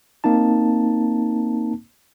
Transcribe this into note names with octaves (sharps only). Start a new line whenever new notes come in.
A#3 C4 D#4 A5